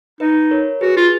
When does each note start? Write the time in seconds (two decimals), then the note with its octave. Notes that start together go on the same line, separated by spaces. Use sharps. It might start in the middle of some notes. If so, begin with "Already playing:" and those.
0.20 D#4 B4 D#5
0.51 A#4 C#5
0.81 F#4 G#4 B4
0.97 F4